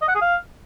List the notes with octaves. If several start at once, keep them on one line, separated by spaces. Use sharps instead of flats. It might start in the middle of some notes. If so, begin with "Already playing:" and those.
D#5
F#5
G#4
F5